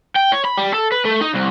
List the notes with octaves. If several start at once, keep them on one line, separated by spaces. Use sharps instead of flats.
G5
C#5
B5
G3
A4
B4
A3
D#4
C2